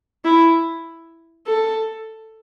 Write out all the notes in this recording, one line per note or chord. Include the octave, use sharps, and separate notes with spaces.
E4
A4